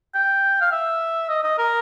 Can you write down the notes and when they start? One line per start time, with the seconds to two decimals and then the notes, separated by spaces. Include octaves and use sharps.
0.15 G5
0.61 F5
0.72 E5
1.29 D#5
1.43 D#5
1.58 A#4